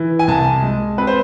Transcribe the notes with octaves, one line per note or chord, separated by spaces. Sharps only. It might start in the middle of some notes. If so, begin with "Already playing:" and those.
Already playing: E3
G#5
C2 A5
G#3
C4 B4
C5